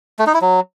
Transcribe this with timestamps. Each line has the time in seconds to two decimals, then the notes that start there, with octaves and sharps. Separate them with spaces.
0.19 A3
0.27 D#4
0.34 E4
0.41 F#3